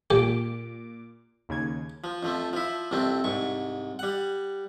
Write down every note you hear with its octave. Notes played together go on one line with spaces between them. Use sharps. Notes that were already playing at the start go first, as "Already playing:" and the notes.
A#2 G4 D6
D#2 C#3 G#6
F3
F2 F3 A3
F3 E4
C2 F2 A3 C4
C2 G#2 C#6
G3 F#5